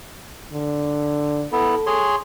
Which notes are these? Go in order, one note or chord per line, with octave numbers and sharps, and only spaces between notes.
D3
B3 E4 A4
G#4 C#5 C6